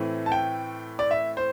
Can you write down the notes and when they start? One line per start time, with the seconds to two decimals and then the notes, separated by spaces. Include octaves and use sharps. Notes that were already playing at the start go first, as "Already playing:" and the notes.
Already playing: A2 E3 A3 C4
0.26 A5
0.32 G5
0.99 D5
1.11 E5
1.37 C5